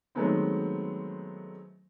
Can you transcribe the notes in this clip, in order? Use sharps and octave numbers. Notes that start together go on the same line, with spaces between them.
D#3 F#3 G#3 A3 B3 C4